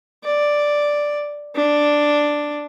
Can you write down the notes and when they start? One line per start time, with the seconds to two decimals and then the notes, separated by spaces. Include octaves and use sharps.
0.24 D5
1.55 D4